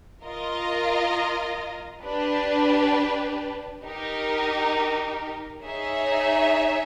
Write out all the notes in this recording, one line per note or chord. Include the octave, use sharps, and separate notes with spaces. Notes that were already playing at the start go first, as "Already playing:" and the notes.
F4 A#4 D#5
D4 G4 B4
D#4 G4 A#4
D#4 G#4 C#5 E5